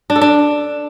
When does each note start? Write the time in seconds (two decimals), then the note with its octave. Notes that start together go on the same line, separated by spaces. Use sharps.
0.10 D4
0.16 A4
0.21 D4